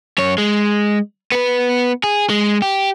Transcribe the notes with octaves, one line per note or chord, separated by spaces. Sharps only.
F#2 C#5
G#3
B3 B4
G#4
G#3
G4